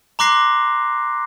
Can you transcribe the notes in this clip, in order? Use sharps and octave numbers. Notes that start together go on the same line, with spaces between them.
A#5 C6 D6 F#6 A#6 C7